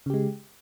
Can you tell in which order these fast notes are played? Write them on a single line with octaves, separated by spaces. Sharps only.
C#3 G4 G#3